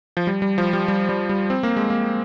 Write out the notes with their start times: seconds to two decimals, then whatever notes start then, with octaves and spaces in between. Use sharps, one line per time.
0.17 F3
0.27 G3
0.42 G3
0.58 F3
0.73 G3
0.88 G3
1.09 G3
1.29 G3
1.50 C4
1.63 A#3
1.76 G#3
1.90 A#3